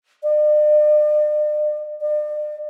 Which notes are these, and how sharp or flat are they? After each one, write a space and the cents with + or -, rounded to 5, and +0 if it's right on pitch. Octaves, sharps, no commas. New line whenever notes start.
D5 +45
D5 +40